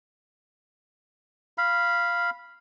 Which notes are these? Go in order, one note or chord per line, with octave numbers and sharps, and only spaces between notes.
F5 B5